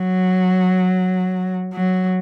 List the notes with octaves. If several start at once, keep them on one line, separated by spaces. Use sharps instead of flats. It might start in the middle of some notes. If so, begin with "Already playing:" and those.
Already playing: F#3
F#3